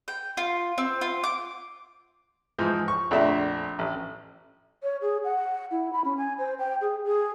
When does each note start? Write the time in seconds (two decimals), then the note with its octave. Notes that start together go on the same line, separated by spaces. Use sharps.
0.08 G5
0.37 F4
0.78 C4
1.01 F4
1.24 D6
2.59 G#2 E3 F3
2.88 C#6
3.11 A#1 F2 A3 D4 E5
3.79 A1
4.83 C#5
5.01 G#4
5.24 F#5
5.71 E4
5.93 B5
6.04 C#4
6.17 G#5
6.38 C5
6.59 G5
6.81 G#4
7.04 G#4